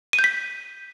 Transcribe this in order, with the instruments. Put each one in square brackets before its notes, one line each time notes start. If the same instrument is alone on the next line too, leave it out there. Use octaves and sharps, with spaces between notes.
[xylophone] D#7
G6
B6